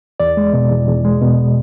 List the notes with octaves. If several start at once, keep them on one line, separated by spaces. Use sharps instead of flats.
E2 D5
G#3
B2
E2
E2
G#3
B2